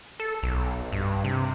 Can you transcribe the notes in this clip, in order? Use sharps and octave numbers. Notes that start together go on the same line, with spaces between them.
A4
B1
G2
C3